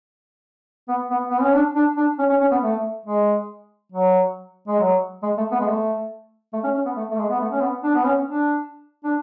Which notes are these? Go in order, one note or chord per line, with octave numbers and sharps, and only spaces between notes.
B3
B3
B3
C#4
D4
D4
D4
C#4
C#4
C#4
B3
A3
G#3
F#3
G#3
F#3
G#3
A3
B3
G#3
A3
A3
C#4
C#4
B3
A3
A3
G#3
B3
A3
C#4
B3
D4
B3
C#4
D4
D4